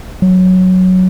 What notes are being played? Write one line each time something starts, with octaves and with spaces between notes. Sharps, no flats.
F#3